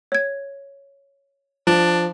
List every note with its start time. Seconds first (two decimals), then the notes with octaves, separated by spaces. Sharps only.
0.12 C#5 G#6
1.67 F3 D4